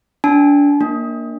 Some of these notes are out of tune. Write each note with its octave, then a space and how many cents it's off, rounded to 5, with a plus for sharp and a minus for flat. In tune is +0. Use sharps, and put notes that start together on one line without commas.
D4 -30 A5 -45
A#3 +0 D4 +0